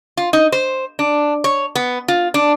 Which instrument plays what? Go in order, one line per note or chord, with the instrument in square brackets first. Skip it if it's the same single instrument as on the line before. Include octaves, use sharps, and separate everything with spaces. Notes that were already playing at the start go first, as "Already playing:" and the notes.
[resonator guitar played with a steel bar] F4
D#4
C5
D4
C#5
B3
F4
D4